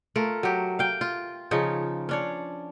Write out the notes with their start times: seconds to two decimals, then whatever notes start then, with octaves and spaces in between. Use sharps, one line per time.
0.16 A3 F4 A#4
0.43 F#3 G4
0.79 F5 G5
1.01 F4
1.51 C#3 F3 D#4 C#5
2.09 C#4 D4 C#5